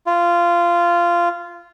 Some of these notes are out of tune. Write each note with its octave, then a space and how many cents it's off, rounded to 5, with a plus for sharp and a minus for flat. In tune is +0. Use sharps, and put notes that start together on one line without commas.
F4 -15